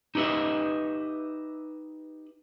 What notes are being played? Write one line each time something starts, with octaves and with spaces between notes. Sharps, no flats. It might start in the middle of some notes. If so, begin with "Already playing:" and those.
D#4 G4 B4 D#5 E5